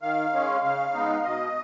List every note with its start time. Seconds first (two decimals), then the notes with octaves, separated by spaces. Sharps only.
0.02 D#3 F5
0.33 G#3 C#4
0.63 C#3 F5
0.94 G#3 B3 D#4
1.24 B2 D#5